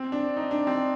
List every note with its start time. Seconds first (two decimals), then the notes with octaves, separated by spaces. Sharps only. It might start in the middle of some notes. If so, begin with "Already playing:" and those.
Already playing: C4
0.12 D4
0.37 D#4
0.51 D4
0.67 C4